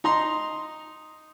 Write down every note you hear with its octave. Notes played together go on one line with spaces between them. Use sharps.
D#4 A#5 C6